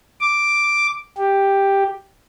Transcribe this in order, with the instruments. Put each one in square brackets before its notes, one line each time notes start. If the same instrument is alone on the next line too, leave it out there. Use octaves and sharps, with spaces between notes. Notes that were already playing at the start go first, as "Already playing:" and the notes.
[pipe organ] D6
G4